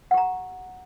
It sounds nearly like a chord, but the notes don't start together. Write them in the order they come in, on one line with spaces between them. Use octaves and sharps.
F#5 G4 A#5